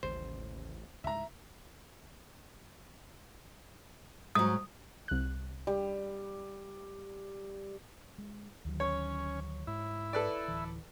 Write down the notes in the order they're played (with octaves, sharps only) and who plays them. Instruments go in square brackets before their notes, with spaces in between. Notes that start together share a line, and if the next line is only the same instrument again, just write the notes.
[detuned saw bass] A1 [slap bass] D#2 C#3 G3 [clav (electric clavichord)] C5
[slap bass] C#2 G#2 [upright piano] E5 A#5
[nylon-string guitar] G#2 F#3 [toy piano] D#6
[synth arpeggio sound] C2 F#6
[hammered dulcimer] G3
[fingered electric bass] G#3
D2 D#3 F#3
[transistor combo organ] C#4 [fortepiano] C#5
[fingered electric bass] G#2 [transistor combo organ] E4
[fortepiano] A4 B4 D5
[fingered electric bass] D1 E3